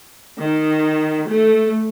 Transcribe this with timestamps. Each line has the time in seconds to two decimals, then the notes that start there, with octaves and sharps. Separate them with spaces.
0.43 D#3
1.30 A3